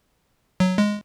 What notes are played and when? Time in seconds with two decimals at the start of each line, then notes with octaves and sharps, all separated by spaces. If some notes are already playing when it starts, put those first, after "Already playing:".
0.60 F#3
0.78 G#3